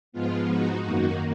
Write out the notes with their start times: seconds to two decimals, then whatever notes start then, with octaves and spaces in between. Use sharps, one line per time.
0.12 G#2 F3 G#3 B3 F4
0.47 D#4 F#4
0.81 F#2 D#3 A#3 D#4 F#4